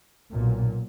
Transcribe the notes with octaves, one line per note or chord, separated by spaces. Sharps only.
B1 A#2